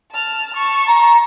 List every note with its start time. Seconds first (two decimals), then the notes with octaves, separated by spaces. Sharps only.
0.12 A5 F6
0.54 A5 C#6
0.88 A#5